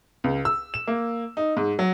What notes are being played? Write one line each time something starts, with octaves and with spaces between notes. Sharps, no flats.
C#2
E6
E7
A#3
D#4
G#2
F#3